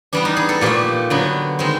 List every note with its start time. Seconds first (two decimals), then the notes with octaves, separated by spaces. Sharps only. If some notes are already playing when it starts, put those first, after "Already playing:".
0.13 E3 G3 B3 D4
0.25 D#4
0.37 G#4
0.49 A4
0.61 A#2 F3 A3 G4
1.10 D3 F#3 B3
1.59 D#3 G#3 C4